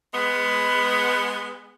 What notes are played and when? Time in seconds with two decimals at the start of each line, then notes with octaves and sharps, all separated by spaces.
0.14 G#3 B3